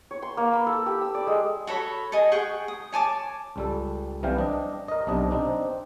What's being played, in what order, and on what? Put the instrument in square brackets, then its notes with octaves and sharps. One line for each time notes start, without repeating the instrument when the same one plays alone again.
[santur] C#5
C6
A#3
B5
A4
G4
E6
D5
G#3
[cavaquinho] F#4 A4 C#5 B5
A4 D#5 G#5 D#6
G#4 F#5 G5 C#6
D#6
C#5 G#5 A5 D6
[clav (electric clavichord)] C#2 G3 A4
C2 C3 E3 G3 F5 G5
D4 D#5
A#4 D#5
B1 C3 D4 D#5
C4 D4 D#4